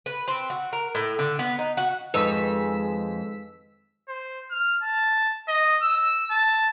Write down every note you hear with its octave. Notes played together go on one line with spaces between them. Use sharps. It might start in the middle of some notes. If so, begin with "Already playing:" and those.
B4
C4
F#4
A#4
A2
D3
B3
D#4
F#4
F2 D#3 G#3 B4 D#5 E6 B6
C5
F6
A5
D#5
E6
A5